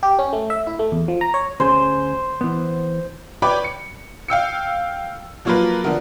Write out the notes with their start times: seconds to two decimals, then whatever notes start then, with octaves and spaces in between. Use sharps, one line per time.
0.03 G4
0.19 C#4
0.33 A3
0.50 E5
0.67 E4
0.79 A3
0.92 E2
1.08 F3
1.21 A#5
1.34 C#5
1.60 D2 C#4 G#4 C5
2.41 E3 B3
3.42 B4 C#5 D5 G5 B5 D6
3.64 C#7
4.28 F5 G5 E6 C#7
5.45 F3 F#3 A#3 F4 A#4 B4
5.84 D3 F3 B3 A#4